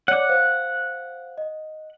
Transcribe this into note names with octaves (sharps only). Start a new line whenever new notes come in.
C#5 D5 F#5 D6
C5 F5
D#5